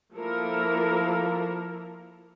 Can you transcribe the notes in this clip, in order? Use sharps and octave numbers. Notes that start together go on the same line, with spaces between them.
F3 A#3 E4 A4 A#4